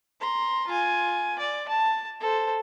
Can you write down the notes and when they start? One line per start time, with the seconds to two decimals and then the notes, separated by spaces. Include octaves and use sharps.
0.20 A#5 C6
0.67 F4 G#5
1.39 D5
1.68 A5
2.21 A4 C5